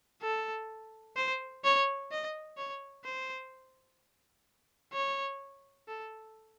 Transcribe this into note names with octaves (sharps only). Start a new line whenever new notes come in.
A4
C5
C#5
D#5
C#5
C5
C#5
A4